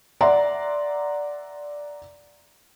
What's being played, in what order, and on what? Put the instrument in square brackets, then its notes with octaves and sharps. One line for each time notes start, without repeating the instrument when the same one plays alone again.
[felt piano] D5 E5 F#5 A#5 C6